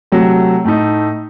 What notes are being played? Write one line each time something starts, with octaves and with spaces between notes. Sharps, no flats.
C3 F#3 A3
A2 A3 D#4